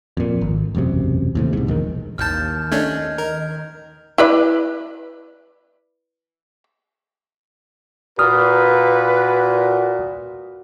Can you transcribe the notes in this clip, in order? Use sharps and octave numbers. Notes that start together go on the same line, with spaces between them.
F2 A#2
G#1
E1 A1 F#2 C3
D#2 A2 C3
C2 G#2
E1 A#1 A#2 D#3
A1 D#2 A5 F6 G6
A3 C#4 D4 D#5 G#6
D#3 A#4
E4 B4 D5
A#2 F#4 B4 D#6 F6